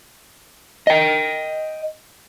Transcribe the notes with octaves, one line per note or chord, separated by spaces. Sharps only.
D#5 G5